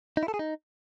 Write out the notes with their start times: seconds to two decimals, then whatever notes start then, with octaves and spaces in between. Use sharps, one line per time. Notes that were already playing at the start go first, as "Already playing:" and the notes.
0.17 D#4
0.23 E4
0.28 A4
0.34 G#4
0.39 D#4